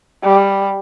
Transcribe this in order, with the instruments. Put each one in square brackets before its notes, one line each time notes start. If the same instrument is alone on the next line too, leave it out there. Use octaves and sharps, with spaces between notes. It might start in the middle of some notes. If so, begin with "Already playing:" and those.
[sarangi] G3